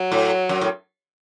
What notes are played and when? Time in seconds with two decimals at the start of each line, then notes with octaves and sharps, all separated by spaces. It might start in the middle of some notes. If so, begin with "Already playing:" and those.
Already playing: F#3
0.12 A2
0.49 F#2
0.61 A2